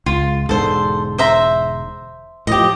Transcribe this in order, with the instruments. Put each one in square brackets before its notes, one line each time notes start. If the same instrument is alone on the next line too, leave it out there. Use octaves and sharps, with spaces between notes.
[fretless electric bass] C#2 [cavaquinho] F4
[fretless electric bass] E1 G#2 D3 [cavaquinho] A4 C5
[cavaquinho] C5 E5 A#5
[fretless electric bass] A2 F3 [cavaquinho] G4 D#5